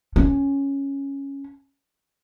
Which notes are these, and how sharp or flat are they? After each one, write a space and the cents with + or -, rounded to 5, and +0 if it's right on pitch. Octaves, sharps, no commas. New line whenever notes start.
C#4 +0